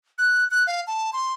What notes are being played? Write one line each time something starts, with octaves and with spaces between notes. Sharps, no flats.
F#6
F#6
F5
A5
C6